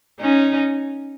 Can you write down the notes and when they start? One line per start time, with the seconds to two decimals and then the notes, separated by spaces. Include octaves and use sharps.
0.20 C#4 D#4